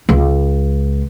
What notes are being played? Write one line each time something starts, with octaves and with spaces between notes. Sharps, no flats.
C#2